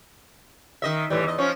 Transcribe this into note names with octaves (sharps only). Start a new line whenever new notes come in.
D#3 D#5 E5
A2 E3 G3
E2 D#5
F3 C#4